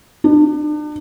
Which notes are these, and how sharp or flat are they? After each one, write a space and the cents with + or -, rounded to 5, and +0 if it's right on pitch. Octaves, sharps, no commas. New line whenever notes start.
D4 +35